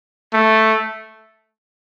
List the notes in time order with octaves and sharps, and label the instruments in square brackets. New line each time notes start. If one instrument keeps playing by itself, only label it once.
[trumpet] A3